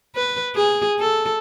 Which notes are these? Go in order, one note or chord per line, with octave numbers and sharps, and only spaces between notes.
B4
G#4
A4